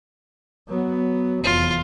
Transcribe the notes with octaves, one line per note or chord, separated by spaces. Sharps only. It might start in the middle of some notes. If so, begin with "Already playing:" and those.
F#3 B3
F1 E2 F4